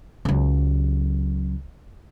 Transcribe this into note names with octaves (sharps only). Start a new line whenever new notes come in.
C#2 F#3